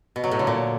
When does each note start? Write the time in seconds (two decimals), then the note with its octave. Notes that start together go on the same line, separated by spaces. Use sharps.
0.16 B2
0.24 F#3
0.31 A2
0.39 D3
0.47 A#2